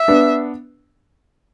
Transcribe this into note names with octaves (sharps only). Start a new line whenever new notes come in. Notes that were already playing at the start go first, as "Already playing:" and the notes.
Already playing: E5
B3 D4